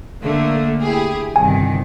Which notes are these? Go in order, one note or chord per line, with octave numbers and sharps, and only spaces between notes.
D3 A3 A#3
E4 G4 G#4
G1 C2 D#3 G#5